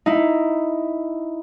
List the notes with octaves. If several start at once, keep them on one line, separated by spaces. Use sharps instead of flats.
D#4 E4